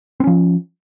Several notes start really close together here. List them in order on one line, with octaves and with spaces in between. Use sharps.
C4 C#4 F3